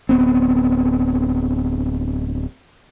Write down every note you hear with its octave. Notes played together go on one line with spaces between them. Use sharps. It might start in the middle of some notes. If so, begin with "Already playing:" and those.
D1 B3 C4